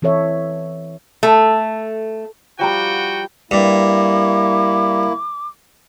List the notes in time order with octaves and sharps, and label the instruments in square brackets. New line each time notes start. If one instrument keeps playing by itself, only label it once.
[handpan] E3 C4 A4 C#5 E5
[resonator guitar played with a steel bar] A3
[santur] F3 G3 A#5 [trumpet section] F#4 F#5 G5
[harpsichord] G2 [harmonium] A#3 E4 [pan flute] D6